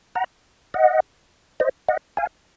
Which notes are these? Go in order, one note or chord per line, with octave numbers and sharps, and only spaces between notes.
F#5 A#5
D#5 F#5
C5 D#5
D#5 F#5
F5 G#5